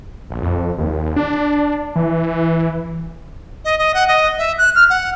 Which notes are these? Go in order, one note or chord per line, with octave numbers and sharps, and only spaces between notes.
A#1
F2
D#2
D4
E3
D#5
D#5
F#5
D#5
E5
F#6
F6
F#5